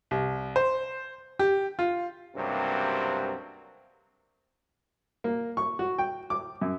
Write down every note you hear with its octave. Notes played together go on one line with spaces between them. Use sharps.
C2
C5
G4
F4
C#2 G2 C3 F#3 A#3 C4
A#3
C#6
F#4
G5
D6
F#2